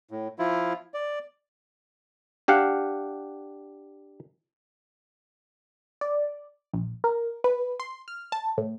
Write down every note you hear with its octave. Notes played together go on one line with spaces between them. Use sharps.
A2
F3 E4 F4
D5
D4 G4 F5 F#5
D5
A#1
A#4
B4
C6
F6
A5
A2